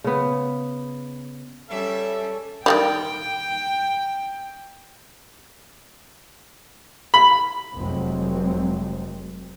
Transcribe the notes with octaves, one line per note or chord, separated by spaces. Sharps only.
C#3 B3
G3 C#4 A4 E5
D#3 E3 G3 G5
B5
F1 F2 C3 F#3 G#3 C4